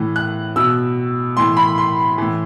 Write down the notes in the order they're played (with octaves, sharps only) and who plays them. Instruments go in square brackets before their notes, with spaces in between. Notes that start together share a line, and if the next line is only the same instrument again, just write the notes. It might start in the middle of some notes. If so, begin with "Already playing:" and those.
Already playing: [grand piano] A2 E3
F#6
B2 E6
A2 E3 C6
B5
C6
A2 E3